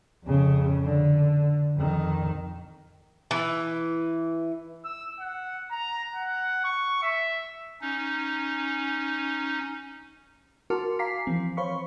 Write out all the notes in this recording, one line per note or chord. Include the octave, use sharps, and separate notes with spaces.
F2 C#3
D3
F2 D#3
E3
E6
F#5
A#5
F#5
C#6
E5
C#4 D#4
F#4 A#4 A5 C6 D6 F6
F5 G#5 A#5 D6 B6 C7
E3 F3 C4
C5 C#5 F5 B5 C#6